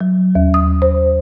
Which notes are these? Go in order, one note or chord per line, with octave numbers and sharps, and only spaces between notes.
F#3
D#2
D#6
C5